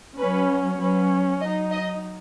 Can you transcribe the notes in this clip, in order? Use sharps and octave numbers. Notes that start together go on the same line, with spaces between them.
F#3 C#4 B4
F#3 C#4 B4
F#3 D#4 D#5
D#5